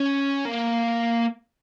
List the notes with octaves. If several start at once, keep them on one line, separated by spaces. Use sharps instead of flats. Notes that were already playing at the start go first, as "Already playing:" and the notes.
Already playing: C#4
A#3